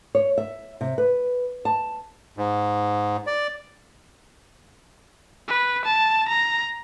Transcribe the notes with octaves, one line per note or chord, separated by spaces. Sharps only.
C#5
E5
C3
B4
A5
G#2
D5
B4
A5
A#5